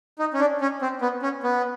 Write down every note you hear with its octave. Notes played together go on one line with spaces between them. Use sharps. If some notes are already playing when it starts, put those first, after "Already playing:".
D#4
C#4
D4
C#4
C4
B3
C#4
B3